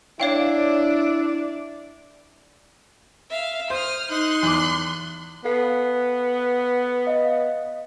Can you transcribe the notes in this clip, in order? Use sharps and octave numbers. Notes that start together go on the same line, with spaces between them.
D4 E4 C#5 D5 F5 G5
E5 F5
C5 D#6 F6
D#4 C6 F#6
E2 D6
B3 A4 F5 C7
D#5 F5